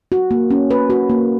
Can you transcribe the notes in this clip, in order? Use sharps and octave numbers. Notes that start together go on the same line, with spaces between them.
F#4
A#3
C#4
B4
F#4
A#3